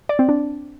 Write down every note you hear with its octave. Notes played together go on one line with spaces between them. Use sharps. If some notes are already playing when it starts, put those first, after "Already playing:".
D5
C4
D4